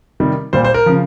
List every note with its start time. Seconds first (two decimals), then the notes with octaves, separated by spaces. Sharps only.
0.20 C3 D#3 G3
0.53 A#2 G3 C5
0.64 C5
0.74 A#4
0.86 C#3 F3